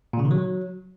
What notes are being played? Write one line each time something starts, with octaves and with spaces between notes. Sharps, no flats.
A#2
C#3
D#3
F#3